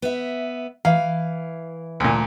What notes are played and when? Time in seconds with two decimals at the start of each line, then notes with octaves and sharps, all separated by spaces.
0.02 B3 E5
0.85 E3 F5
2.00 D2 A#2